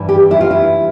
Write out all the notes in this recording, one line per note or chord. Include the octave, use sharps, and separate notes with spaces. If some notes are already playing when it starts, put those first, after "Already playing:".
Already playing: G2 E3
G4
E4
F4
E4